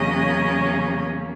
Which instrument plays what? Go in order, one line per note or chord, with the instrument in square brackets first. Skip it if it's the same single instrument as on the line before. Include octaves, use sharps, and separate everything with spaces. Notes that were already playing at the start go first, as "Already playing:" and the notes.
Already playing: [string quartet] E2 C#3 F#3 A#3 C#4 D#5